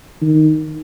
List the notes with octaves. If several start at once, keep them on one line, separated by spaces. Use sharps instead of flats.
D#3